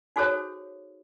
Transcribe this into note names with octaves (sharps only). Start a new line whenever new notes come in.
D#4 F#4 G#4 A4 C5 C#5